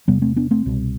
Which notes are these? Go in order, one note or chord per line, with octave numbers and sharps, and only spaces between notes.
E2 C3 G3 B3
A3 C4
B3 D4
A3 C4
C2 B2